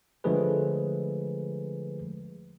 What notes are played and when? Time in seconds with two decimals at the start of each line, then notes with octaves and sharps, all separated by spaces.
0.24 D3 F3 G#3 A3 G#4 B4